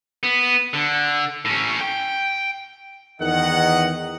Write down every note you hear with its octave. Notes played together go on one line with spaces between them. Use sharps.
B3
D3
A2 C#4
G5
E2 D#3 D#5 F#5